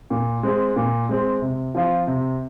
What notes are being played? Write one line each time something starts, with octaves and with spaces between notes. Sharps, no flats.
A#2
G#3 C4
A#2
G#3 C4
C3
F3 C4 F4
C3